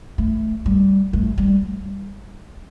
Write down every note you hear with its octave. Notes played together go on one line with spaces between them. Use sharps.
A3
G3
A3
G3